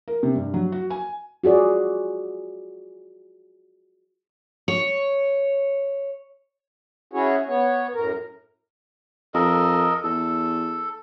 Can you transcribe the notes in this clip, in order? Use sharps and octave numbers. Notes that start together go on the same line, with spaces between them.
A#4
C3
G2
F#3
F#4
G#5
F4 F#4 G#4 D5
C#5
C#4 E4 F#4 G#4 C#5
B3 C#5
F#2 A2 A#4
F2 A4 A#4 D#5
E2 A4